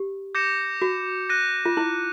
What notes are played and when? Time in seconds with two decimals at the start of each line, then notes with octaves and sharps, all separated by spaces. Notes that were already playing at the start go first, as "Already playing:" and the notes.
Already playing: G4
0.35 D6 G6 A#6 C#7 E7
0.82 F#4
1.29 F#6 A#6 D#7
1.66 F4
1.77 E4